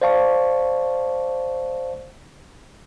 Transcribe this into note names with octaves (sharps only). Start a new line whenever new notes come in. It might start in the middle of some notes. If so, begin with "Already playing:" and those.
C5 D5 F5 A5 C#6